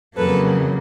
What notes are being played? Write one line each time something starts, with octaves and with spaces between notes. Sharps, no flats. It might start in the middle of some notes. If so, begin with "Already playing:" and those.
F2 C#3 F#3 A#3 A4 B4